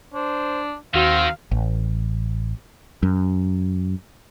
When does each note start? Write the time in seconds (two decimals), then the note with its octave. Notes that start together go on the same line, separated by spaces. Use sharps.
0.14 D4 C5
0.94 D#2 D#3 C4 F#4 F5
1.51 A1
3.03 F#2